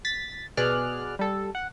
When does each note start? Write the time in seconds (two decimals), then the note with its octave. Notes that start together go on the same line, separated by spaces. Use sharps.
0.05 A6 B6
0.57 B2 B3 G#4 D5 F6 F#6
1.19 G3 A4
1.55 F#5